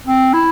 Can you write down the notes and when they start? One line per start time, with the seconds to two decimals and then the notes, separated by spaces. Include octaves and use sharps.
0.07 C4
0.33 E4